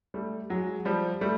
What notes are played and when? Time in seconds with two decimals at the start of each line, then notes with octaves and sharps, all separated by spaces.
0.14 G3 A3
0.50 F#3 G#3
0.85 F3 G3
1.21 G3 A3